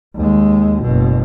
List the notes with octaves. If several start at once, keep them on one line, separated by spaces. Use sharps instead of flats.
D#2 G#3
F#1 B2